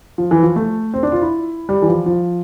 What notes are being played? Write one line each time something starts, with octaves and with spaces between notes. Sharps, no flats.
F3
E3
F3
A3
C4
D4
F4
E4
G3
E3
F3
F3